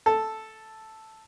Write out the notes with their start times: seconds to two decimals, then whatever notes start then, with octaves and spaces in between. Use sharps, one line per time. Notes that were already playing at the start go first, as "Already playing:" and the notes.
0.06 A4